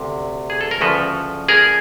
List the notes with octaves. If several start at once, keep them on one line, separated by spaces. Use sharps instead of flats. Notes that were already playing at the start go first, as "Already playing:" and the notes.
Already playing: D2 C3
G#4
A4
A#4
D2 C#3 F3 A4 B4
G#4 A#4